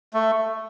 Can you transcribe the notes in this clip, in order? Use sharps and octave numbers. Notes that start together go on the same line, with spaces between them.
A3